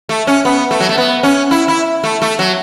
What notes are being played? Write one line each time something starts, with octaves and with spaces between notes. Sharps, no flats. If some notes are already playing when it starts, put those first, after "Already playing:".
A3
C#4
B3
A3
F#3
A3
B3
C#4
E4
E4
A3
A3
F#3